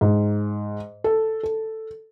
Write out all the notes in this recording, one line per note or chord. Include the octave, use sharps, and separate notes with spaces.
G#2
A4
A4